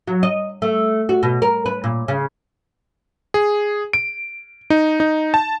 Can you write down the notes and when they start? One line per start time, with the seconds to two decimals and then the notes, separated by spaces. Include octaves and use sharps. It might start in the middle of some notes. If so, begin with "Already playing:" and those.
0.08 F#3
0.23 D#5
0.62 A3
1.09 F#4
1.23 B2
1.42 A#4
1.66 B4
1.84 A#2
2.08 C#3
3.34 G#4
3.93 D7
4.70 D#4
5.00 D#4
5.34 A5